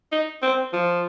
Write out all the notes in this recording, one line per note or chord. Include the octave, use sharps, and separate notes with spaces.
D#4
C4
F3